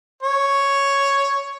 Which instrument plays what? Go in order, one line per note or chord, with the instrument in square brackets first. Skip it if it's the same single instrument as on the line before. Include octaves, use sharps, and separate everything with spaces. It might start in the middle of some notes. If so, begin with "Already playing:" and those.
[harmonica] C#5